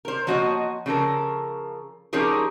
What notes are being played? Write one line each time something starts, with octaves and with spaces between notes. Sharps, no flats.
A#4 C5
F3 A#3 F#4 C#5 D#5
C#3 F3 A4 A#4
F3 C#4 D#4 G4 G#4 A#4